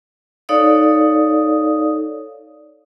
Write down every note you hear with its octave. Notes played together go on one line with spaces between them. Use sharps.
D#4 A4 C#5 D5 F5 D#6